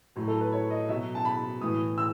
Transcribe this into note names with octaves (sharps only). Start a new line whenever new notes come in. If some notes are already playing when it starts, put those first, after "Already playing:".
A2 F#3
A4
B4
C#5
D#5
B2 F#3 E5
A5
B5
A2 E3 D#6
E6